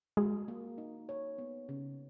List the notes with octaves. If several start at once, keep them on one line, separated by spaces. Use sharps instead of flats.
G#3 F#4
A#3
D#4
C#5
B3
C#3